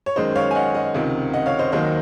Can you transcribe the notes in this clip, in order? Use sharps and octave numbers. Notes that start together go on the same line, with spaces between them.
C#5
F#2 D#3 G#3 C5 D#5
C#5 F5
G#5
D#5 F#5
D#5 F#5
C#2 C3 D#3
D#5 F#5
C#5 F5
C5 D#5
D#2 D#3 F#3 A#3 C5 D#5